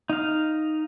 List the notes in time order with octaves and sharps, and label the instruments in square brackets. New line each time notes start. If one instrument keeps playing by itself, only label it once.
[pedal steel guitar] D#4 F5